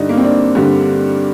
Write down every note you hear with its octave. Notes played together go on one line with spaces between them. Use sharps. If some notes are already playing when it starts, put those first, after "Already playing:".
Already playing: G2 D3 G3 D4 D#4
A#3
C4
D4
G2 D3 G3